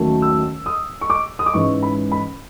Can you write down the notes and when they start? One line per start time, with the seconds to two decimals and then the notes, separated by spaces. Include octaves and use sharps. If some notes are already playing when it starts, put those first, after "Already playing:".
Already playing: D#2 D#3 F#3 A3 C#4
0.22 E6
0.66 D#6
1.01 C#6
1.10 D6
1.39 D#6
1.46 D6
1.54 G#2 E3 G#3 C#4 C#6
1.83 B5
2.12 B5